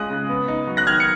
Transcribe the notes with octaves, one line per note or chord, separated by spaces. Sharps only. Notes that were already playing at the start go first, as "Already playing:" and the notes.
Already playing: G#3 C#4 F4 D#6 F#6
C#3
B3
D#4
F#3
F#6 A#6
D#3 F6 G#6
C#7